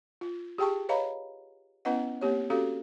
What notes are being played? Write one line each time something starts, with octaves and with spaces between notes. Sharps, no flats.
F4
G4 G#4 G5 A5 C#6
B4 C#5 D#5 F5 A#5 B5
B3 C#4 E4 B4 D#5 F#5
A#3 C4 G4 C#5
C#4 F#4 G4 A4 F5